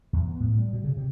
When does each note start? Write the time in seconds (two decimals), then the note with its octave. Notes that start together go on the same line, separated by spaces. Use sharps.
0.13 E2
0.28 B3
0.40 A2
0.58 G3
0.73 B2
0.84 C#3
0.97 C3